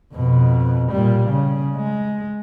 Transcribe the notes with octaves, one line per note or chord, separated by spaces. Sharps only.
F2 B2
A#2 G3
C#3
G#3